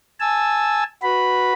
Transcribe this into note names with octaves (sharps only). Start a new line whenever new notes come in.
G#5 A5 E6
F#4 B4 B5